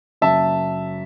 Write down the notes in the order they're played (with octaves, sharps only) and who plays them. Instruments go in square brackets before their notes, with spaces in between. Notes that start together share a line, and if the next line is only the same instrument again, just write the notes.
[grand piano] F#1 F#2 F#3 E5 A5